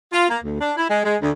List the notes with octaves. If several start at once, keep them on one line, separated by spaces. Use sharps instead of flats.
F4
A#3
D2
D4
E4
G#3
G#3
D2